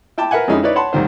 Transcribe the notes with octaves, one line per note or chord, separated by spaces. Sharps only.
E4 G5 A5 D6
A#4 B4 E5 F#5 G#5
F2 G#3 C#4 D#4 E4
D#4 E4 B4 C#5 D5
C#5 F#5 A5 B5 C6
C2 A2 D#3 C5